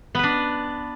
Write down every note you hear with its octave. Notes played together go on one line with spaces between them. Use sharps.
B3 D4 B4